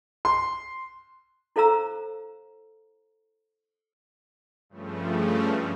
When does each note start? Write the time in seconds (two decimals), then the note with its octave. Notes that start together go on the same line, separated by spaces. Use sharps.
0.25 C6
1.56 E4 A4 C5 F5 A#5 E6
4.69 G2 C#3 F3 A3